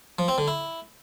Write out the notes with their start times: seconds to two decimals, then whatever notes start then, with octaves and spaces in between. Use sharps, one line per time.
0.19 F3
0.28 C4
0.38 D3
0.48 E4